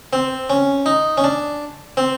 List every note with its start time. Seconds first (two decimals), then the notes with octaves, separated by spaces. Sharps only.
0.13 C4
0.50 C#4
0.86 D#4
1.17 C#4
1.24 D4
1.97 C4